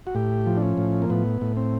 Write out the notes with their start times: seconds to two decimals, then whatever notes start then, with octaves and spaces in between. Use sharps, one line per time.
0.07 F#4
0.15 A2 G4
0.46 F3
0.57 D4
0.62 C#4
0.78 A2
1.02 A#3
1.10 A2 B3
1.41 A2
1.57 C4